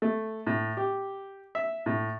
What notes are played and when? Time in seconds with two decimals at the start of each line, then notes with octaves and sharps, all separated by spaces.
0.02 A3
0.47 A2
0.77 G4
1.55 E5
1.86 A2